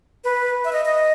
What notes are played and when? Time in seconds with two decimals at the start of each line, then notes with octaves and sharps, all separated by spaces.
0.24 B4
0.65 E5
0.73 D#5
0.85 D#5